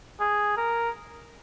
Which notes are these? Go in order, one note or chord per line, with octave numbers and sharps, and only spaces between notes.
G#4
A#4